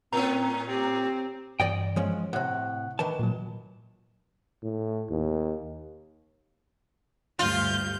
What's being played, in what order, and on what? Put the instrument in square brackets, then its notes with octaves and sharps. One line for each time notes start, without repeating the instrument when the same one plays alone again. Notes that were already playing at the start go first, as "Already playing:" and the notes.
[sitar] A2 C#4 [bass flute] C4 [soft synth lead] A#5
[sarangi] C4 [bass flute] G4
[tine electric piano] G2 E3 [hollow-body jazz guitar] D5 D#5 G5
[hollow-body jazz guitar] F3 G#3 C#4
[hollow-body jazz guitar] A2 C3 [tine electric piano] F#5 F#6
[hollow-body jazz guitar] D#3 E3 A5 [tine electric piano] A#4 B4
[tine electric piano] A#2 F#3
[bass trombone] A2
D#2
[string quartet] D2 G2 G6 [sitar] F4